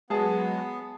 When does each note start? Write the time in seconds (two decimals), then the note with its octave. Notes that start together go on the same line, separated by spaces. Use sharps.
0.10 F#3 G#3 B3 G#4 A5